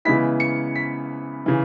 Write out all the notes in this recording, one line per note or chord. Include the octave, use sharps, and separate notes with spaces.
C#3 E3 G#3 B3 E4 B6
C#7
B6
C#3 E3